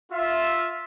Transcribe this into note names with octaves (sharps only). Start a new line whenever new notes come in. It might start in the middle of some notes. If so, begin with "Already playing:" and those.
F4 E5